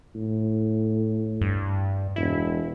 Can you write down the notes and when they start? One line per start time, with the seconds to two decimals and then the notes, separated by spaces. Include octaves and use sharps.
0.15 A2
1.41 G2
2.16 E1 E4